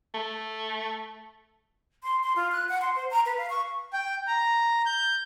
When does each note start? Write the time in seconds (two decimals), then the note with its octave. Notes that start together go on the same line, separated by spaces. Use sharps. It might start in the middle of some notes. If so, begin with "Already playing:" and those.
0.14 A3
2.03 C6
2.23 C6
2.36 F4
2.52 F#6
2.69 F#5
2.82 C6
2.96 C5
3.11 A#5
3.26 B4
3.38 F5
3.50 C#6
3.93 G5
4.27 A#5
4.86 G6